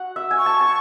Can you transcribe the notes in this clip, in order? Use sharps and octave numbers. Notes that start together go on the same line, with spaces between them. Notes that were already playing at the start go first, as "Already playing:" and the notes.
Already playing: F#4 F#5
E5
G#5
C#6
A5
A5